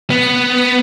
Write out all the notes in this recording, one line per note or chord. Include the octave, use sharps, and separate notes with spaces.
B3